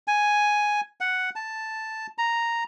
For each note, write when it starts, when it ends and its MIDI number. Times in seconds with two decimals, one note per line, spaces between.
0.08 0.81 80
1.00 1.30 78
1.35 2.07 81
2.18 2.64 82